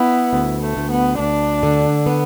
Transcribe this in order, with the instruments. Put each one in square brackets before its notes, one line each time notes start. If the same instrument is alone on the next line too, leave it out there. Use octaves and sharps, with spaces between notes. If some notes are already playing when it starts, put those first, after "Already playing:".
Already playing: [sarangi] B3 [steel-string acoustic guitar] E4
[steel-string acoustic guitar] D2
[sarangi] A3
[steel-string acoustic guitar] D2
[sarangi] B3
[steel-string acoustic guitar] D2 [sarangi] D4
[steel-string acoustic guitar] D3
B3